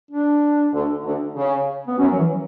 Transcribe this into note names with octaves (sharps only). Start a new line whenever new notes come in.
D4
D2 D3
D2 D3
C#3
B3
F#2 F#3 C#4
F#3
E3